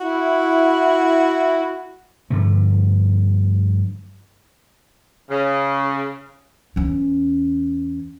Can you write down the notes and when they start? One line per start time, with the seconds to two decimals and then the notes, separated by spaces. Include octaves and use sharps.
0.01 E4 F#4
2.30 G2 D3 F3 A3
5.30 C#3
6.76 E2 C#4